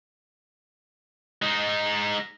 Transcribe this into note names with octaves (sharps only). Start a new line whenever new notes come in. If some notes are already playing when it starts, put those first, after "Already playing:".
G#3 D#4